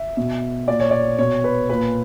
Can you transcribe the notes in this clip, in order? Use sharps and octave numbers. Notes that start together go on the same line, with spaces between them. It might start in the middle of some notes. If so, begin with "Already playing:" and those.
Already playing: E5
B2
A#2 D5
C#5
D5
B2 C#5
B4
A#2 B4